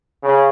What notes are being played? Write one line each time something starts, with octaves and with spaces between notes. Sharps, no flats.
C#3